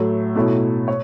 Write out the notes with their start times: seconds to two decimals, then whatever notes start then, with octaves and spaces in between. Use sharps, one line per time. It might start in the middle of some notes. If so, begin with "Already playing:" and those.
Already playing: A2 F#3 A3
0.35 B2 A3 E4 C#5
0.88 C#5